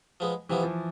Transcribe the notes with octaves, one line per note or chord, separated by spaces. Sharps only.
F3 G#3 B3
C3 E3 F3 B3
F3